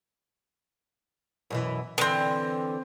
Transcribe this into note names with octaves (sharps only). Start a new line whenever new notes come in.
F#2 B2 E3
D3 E3 B3 C4